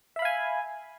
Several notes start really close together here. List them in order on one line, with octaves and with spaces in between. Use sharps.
E5 B5 F5 G#5